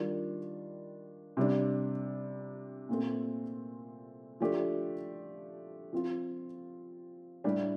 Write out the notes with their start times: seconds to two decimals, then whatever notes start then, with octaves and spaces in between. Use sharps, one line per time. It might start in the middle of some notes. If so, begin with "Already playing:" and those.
Already playing: D#3 G3 D4 F4
1.37 C3 G3 D4
2.89 A#2 A3 C4
4.40 F3 A3 D4 G4
5.93 F3 C4 F4
7.44 A2 G3 D4 G4